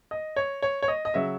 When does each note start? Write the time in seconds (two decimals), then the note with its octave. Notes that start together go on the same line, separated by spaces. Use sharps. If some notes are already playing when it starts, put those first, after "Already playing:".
0.11 D#5
0.36 C#5
0.62 C#5
0.82 C#5
0.88 D#5
1.05 D#5
1.14 C#3 F#3 E5